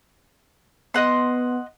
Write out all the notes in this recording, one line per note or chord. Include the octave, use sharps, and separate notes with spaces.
B3 D#5 F#5 C6